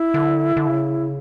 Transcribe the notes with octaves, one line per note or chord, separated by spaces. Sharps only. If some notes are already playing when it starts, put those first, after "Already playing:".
Already playing: E4
D3
D3
C#3